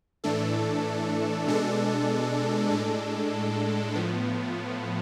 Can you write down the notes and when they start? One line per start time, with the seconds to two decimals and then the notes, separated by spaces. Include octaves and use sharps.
0.24 A2 E3 A3 D4 A4
1.47 B2 G#3 D4 A4
2.71 A2 G#3 D4 A4
3.95 A2 F3 B3